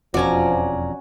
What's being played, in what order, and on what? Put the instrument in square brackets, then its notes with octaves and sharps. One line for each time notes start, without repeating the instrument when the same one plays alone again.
[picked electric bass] E1 F2 [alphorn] F3 [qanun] C#4 F#4 [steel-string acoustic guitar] D5 A#5